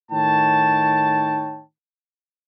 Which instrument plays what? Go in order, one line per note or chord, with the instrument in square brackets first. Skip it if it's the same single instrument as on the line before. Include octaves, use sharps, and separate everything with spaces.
[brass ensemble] A2 D#3 D#4 C#5 G5 A5